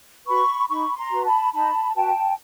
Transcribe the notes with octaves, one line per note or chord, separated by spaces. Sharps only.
F#4 B4 B5 C#6
D#4 B5 C#6
A#5 C6
F#4 B4
A5 B5
D#4 A5 B5
F#4 B4 G5 A5